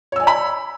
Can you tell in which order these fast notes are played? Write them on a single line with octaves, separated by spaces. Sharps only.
C#5 E6 G#5 D5 B5